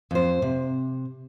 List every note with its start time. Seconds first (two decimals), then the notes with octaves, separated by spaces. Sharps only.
0.11 F2 C5
0.42 C3